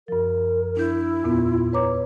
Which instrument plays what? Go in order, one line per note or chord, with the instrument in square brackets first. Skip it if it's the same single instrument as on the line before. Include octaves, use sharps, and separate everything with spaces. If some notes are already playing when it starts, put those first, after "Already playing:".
[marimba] F#2 F3 [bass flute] A#4
[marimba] D4 G6 [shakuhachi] E4
[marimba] E2 A#2 B3 [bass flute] F4
[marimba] B4 A#5 D6 [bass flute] C#5